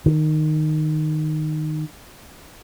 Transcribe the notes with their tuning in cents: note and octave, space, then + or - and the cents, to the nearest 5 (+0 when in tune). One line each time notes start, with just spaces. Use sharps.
D#3 -10